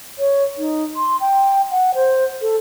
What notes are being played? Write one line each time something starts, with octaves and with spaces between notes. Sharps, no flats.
C#5
D#4
C6
G5
F#5
C5
A4